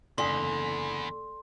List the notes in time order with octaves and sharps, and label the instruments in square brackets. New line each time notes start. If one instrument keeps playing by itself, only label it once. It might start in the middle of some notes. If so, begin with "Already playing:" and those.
[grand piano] F#1 G#5 D#6 [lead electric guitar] E2 [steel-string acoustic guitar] D3 [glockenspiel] C6